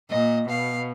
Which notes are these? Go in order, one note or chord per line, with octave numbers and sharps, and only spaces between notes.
A#2 D#5
B2 F5